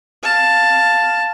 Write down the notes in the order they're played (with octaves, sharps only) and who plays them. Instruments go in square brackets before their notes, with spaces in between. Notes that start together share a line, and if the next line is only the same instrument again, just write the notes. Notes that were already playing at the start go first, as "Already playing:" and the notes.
[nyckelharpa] F5 A5